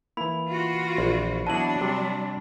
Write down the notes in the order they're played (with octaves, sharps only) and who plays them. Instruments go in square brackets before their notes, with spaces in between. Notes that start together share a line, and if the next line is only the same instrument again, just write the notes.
[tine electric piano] E3 A#3 [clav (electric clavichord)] E4 [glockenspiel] B5
[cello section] F4 F#4
[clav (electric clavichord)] A#1
[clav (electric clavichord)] B2 E4 F#4 [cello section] F#3 D4 [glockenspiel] A5 F#7
[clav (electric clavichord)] C3 [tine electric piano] G3